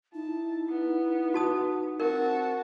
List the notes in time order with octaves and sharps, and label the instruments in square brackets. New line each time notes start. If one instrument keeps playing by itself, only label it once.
[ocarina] D#4 [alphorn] E4 [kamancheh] A5
[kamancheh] B3
[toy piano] F#4 A5 D#6
[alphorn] C4 [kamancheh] F#4 A5 [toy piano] A#4